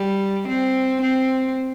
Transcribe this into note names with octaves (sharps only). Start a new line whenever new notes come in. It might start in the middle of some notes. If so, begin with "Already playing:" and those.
Already playing: G3
C4
C4